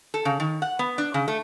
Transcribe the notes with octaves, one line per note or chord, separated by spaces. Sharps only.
A4
C#3
D#3
F#5
B3
D4
C#3
A3